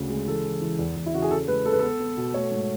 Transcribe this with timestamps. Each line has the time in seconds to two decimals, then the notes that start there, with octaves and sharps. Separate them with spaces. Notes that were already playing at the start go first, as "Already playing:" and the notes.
Already playing: D2 C#3
0.10 G#3
0.27 E3 A4
0.44 E3
0.61 E3
0.79 E2
0.96 E2
1.06 E4
1.14 C#3 F#4
1.22 G#4
1.31 C#3 A4
1.48 G#3 B4
1.65 G#3 A4
1.72 B4
1.79 B3 A4
2.00 B3
2.17 B2
2.34 A3 C#5
2.52 G#2